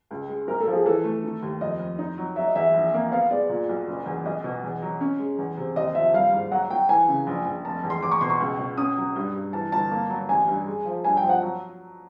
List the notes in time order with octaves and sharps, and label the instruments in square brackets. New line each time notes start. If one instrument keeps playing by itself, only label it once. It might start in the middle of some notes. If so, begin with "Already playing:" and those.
[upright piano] C#2
G#3
[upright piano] B1 [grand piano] A#4
[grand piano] A4
[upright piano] F3
[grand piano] G#4
[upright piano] E3 [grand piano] A4
[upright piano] A3
D#3
D#2
[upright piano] F2 [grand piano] D#5
[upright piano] F2
D#4
F#3
[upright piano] F#3 [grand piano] E5
[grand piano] D#5
[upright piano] E2 [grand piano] E5
[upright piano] A#1
A#3
[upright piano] B3 [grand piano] F5
[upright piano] G#3 [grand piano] D5
[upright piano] A#2
B1
F#1
E2
[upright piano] B1 [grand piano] D#5
[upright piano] B2
E2
F#3
C#4
G#3
E2
C3
[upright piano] D#2 [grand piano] D#5
[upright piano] F3 [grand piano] E5
[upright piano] G3 [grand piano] F5
[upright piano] G#2
[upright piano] F#3 [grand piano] F#5
[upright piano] F#3 [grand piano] G5
[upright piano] E3 [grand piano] G#5
[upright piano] C#3
A#1
A#1
[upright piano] F1 [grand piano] A5
[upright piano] E2
[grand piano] C6
[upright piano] E2 [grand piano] D6
[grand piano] C#6
[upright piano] B2 [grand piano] C6
[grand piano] C#6
[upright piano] C#2
B2
[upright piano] C#4 [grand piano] D#6
[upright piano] F#3
G2
G2
[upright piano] E3 [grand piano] A5
[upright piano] G1 [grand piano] A5
[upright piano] A#3
F#3
[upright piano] A1 [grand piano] G#5
[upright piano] G2
G#3
F3
[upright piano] G2 [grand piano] G#5
[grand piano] G5
[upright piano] F3
[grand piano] F#5
[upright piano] F#3